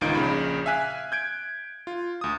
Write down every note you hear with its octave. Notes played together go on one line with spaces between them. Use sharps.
G1 C#2 D#3 D#4 F4 D7
A#1 C#3 B5
E5 F5 G#5 F#6 B6
G6 G#6 D7
F4
D2 D#6